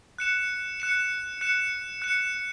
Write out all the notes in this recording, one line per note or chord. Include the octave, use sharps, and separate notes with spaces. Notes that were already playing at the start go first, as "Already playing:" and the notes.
F#6 C#7 E7
F#6 C#7 E7
F#6 C#7 E7
F#6 C#7 E7